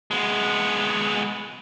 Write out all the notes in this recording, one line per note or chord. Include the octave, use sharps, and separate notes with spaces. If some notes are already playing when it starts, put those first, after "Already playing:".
G#3 B3